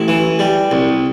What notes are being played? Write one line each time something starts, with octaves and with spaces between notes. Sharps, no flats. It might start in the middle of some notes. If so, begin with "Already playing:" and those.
Already playing: A1 E4
E3
G3
C2